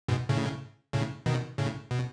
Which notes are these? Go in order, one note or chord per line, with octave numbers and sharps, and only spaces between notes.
G#2 B2
A2 C#3
A2 C#3
B2 D#3
A2 C#3
B2